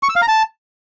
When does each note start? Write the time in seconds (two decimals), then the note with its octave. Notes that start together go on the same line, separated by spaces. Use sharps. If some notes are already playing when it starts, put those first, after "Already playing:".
0.03 C#6
0.09 E6
0.16 F5
0.22 A#5
0.28 A5